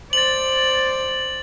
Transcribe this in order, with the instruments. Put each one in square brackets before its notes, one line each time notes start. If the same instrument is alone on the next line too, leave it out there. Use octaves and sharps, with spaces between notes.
[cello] C5 D5 [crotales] A6 F#7